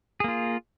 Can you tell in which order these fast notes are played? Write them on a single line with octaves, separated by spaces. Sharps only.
G#4 A#3 F4